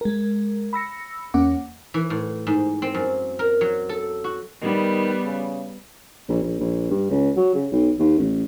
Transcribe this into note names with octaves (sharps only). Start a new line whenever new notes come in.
G#3 A#4
B5 E6 A#6 C#7
E2 A#3 C#4 F#5 D6
E3
A2
G#2
C4
F#2
A#4
F#3
A4
F#4
D#3 G3 B3
C#3
A#1
A#1
A#1
G2
C#2
F#3
C#3
B1
D#2
A1